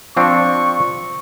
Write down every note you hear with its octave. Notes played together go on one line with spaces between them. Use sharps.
F3 C4 D4 C#6